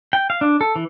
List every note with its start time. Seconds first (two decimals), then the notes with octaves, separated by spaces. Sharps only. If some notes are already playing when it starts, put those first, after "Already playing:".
0.13 G5
0.30 F5
0.41 D4
0.61 A4
0.76 E3